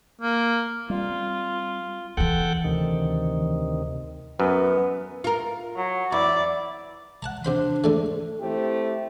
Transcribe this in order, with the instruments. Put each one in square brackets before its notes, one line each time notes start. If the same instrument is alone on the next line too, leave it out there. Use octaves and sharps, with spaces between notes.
[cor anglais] A#3
[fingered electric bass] G3 C4 [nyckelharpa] F4
[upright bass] E2 E3 [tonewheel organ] A4 F#5 G5
[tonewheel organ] D2 C3 D#3
[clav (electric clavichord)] F#2 [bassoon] B3
[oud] F4 A#4
[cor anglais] F#3
[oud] E2 [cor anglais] E4 [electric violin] D5
[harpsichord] F#5 A5 A#5
[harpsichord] C3 C5 B5 [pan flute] D4
[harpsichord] G#2 D3 A3
[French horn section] A3 C4 E4 G4